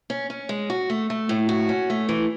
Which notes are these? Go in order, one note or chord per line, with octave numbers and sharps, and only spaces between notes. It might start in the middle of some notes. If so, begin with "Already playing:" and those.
C#4
C#4
G#3
F#4
A3
A3
A2
F#4
C#4
A3
E3